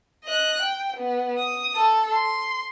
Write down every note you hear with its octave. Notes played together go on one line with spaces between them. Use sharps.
D#5 F#6
G5
B3
D#6
A4
C6